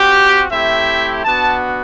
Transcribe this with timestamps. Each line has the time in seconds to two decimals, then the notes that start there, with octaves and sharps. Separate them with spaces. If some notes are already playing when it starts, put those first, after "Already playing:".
Already playing: C4 F#4 G4
0.50 A3 C4 E4 G4 E5
1.23 B3 D4 F#4 A5